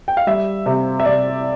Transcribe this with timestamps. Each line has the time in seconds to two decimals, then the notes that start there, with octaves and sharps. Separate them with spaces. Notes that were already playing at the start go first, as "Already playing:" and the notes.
0.08 G5
0.17 F5
0.27 G3 E5
0.66 C3 E5
1.00 E5
1.05 C3 D5